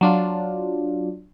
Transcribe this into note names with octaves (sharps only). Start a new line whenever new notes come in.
F#3 D4 F4